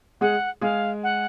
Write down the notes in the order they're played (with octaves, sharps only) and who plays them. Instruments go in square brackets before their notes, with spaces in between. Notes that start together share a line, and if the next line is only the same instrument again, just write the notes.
[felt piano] G#3 G#4 [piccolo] F#5
[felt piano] G#3 G#4 [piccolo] F5
[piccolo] F#5